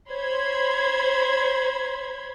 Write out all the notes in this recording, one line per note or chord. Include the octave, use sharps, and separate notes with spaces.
C5 C#5 B5 C6 G#6